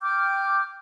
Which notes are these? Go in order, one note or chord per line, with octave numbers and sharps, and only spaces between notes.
G5 D6 F6 G6